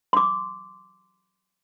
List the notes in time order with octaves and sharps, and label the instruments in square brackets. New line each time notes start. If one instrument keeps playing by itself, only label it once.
[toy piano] C6 D6